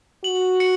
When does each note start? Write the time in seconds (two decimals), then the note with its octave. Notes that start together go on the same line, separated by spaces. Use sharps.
0.24 F#4 F#7
0.60 C#7